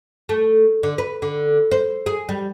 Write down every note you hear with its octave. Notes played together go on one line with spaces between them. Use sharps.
A3
D3
B4
D3
C5
G#4
G3